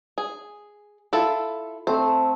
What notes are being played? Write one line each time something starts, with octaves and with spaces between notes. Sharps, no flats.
G#4
E4 F4 A4
A3 C4 C5